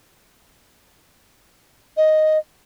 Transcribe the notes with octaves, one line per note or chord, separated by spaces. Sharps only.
D#5